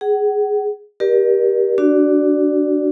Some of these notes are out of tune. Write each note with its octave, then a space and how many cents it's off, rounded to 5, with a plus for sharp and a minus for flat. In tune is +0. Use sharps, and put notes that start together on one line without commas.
G#4 +0 F#5 +35
G4 +0 A#4 +30 D5 +35
D4 +0 F#4 +20 D5 +0